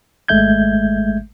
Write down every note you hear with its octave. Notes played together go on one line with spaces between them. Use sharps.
G#1 G#3 A3 E5 G6 G#6